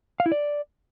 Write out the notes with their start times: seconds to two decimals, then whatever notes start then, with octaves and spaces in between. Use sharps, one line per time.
0.20 F5
0.26 E4
0.32 D5